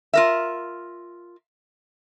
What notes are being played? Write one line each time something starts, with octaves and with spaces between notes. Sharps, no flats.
F4 A#4 E5